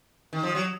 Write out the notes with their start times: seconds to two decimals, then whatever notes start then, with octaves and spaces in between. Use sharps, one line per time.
0.33 D#3
0.43 F3
0.55 F#3